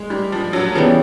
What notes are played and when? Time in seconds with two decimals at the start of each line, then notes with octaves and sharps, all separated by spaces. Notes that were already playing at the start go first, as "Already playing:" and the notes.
Already playing: G#3
0.10 G3
0.32 F3
0.53 F#3
0.75 C#3 E3 F3 G3 B3